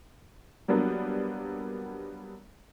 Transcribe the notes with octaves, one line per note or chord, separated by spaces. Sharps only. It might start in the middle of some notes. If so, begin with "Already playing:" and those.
F#3 G3 A#3 B3 D4